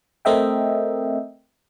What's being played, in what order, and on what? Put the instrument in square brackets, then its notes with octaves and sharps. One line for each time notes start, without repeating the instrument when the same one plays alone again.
[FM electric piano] A3 C4 A#4 D#5 E5 G5